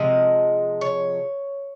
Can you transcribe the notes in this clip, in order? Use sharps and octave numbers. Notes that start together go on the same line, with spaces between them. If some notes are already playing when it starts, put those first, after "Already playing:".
Already playing: C3 F3 G#3 D#5
C#5